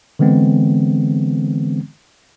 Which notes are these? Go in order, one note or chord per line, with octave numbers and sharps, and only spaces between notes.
D3 E3 G#3 B3 C4